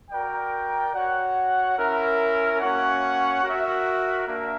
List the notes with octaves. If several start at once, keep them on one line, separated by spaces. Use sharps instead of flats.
F#4 A#4 D5 G5
F#4 C#5 F#5
C#4 E4 A#4
A#3 C#4 F#4 C#5 F#5
F#4 A#4 E5
A#3 D4 A#4 E5